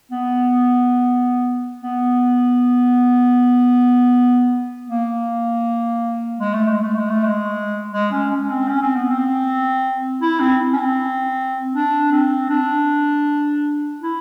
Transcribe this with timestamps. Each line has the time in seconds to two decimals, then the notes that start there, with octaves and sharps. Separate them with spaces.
0.11 B3
1.82 B3
4.88 A#3
6.40 G#3
6.54 A3
6.68 G#3
6.82 A3
6.96 G#3
7.10 A3
7.24 G#3
7.92 G#3
8.12 C#4
8.30 C#4
8.50 C4
8.68 C#4
8.82 C4
8.96 B3
9.10 C4
10.21 E4
10.40 C4
10.73 C#4
10.78 C4
11.73 D4
12.12 C4
12.50 D4
14.02 E4